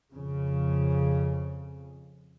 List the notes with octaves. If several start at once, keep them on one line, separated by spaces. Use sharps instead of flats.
F2 C#3